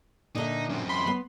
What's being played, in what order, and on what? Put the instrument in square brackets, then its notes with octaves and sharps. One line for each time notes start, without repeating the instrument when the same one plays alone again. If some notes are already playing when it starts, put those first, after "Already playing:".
[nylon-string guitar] A#2 D3 E5 [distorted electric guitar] D#4
[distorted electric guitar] F#2 C4
[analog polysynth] B5 C6
[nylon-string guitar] B3